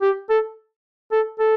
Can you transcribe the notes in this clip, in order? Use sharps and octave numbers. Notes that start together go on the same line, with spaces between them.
G4
A4
A4
A4